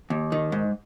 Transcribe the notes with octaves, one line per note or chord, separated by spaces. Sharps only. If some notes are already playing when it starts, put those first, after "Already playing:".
D#2
D#3
G#2